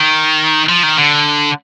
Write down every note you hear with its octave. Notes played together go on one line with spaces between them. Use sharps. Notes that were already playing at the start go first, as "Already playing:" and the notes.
Already playing: D#3
F3
D#3
D3